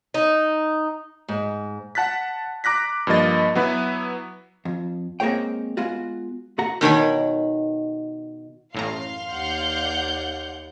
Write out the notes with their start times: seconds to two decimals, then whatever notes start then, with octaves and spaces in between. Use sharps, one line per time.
0.14 D#4
1.28 G#2
1.95 F#5 A5 F#6 A6 B6
2.64 A#5 D6 F#6 A#6 B6
3.07 G2 F3 A#3 D#5 A6
3.55 F#3 B3 E4 B4
4.65 F2
5.20 G#3 A#3 C4 G#4 C#5 G5
5.77 G#3 B3 F4 F#4
6.58 A2 A3 F#4 F#5 A#5
6.81 B2 D#3 C#5 B5
8.74 A1 F#2 A2 F5 A#5 C6 F6 C7
9.31 D#2 D5 F#5 G6